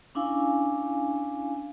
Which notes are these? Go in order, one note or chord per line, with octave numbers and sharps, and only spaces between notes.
C#4 D4 E4 F5 G#5